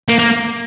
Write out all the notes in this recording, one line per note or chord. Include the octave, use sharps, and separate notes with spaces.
A#3
A#3